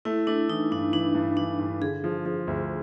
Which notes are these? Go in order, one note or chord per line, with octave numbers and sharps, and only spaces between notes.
A3 E4
A3 D4
E3 D#4
G2 D4
E3 D4
G2
E3 D4
G2
D3 G#4
F3
F3
D2